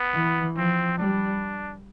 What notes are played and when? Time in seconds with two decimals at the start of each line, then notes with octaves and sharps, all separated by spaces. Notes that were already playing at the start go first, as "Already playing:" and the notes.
Already playing: B3
0.14 E3
0.56 F3 C4
0.98 G3 D4